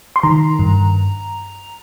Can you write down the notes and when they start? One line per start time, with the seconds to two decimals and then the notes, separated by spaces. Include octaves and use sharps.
0.16 C6
0.23 D#3 A#5
0.59 G2